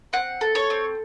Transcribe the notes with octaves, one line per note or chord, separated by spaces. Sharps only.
C4 F#5
A4
C#5
C4